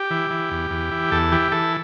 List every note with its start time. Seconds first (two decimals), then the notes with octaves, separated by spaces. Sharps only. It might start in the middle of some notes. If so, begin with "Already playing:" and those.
Already playing: G4
0.11 E3
0.31 E3
0.51 E2
0.71 E2
0.91 E3
1.12 E2 A4
1.32 E3 G4
1.52 E3 A4